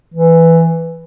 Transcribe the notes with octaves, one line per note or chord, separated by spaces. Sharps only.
E3